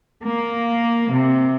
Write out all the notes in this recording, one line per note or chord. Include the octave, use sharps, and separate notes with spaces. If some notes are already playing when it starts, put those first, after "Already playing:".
A#3
C3